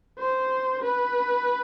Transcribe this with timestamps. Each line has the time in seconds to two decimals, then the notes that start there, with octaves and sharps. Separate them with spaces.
0.19 C5
0.83 B4